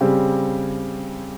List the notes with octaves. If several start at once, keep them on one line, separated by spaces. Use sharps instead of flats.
C#3 G3 C4 G4